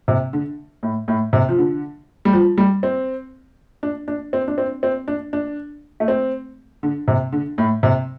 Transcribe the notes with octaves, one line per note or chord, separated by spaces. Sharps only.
C3
D3
A2
A2
C3
F3
D3
G3
F3
G3
C4
D4
D4
C4
D4
C4
C4
D4
D4
A3
C4
D3
C3
D3
A2
C3